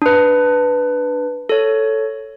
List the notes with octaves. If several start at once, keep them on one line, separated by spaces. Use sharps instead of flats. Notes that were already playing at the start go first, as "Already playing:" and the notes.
D4 B4
A4 C#5